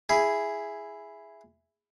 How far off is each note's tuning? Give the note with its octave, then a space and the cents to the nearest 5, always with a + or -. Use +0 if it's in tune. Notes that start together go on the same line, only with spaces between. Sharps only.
E4 +5 G#4 +0